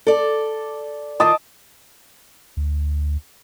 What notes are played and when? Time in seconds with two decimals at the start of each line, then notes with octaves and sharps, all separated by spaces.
0.07 A4 D5
1.20 D#3 F4 D#5 A5 D6
2.57 D2